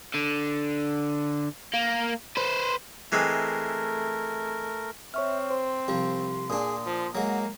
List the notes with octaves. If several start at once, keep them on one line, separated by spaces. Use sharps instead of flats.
D3
A#3
B4 C5
E3 G#3 A3 C4 A#4
C4 C#5 E5 C#6 F6
C5 C6
C2 F3 G4
A#2 D4 G#4 D#6
F3
F#3 G#3 A#3 F#5